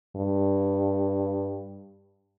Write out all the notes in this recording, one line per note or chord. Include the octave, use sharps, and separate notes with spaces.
G2